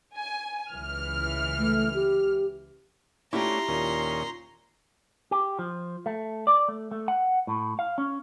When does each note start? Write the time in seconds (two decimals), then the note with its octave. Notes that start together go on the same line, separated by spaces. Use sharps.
0.17 G#5
0.72 C#2 E3 F6
1.58 A3
1.94 G4
3.33 A3 C#4 D4 E4 F4 G4 A#5 C6
3.68 D#2 A#2 C#4
5.31 G4
5.59 F3
6.06 A3
6.47 D5
6.68 A3
6.91 A3
7.08 F#5
7.47 A2
7.79 F5
7.98 C#4